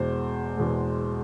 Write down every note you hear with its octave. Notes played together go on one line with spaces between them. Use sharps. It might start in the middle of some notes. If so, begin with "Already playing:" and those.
Already playing: E2 B2 G#3 C5
E2 B2 G#3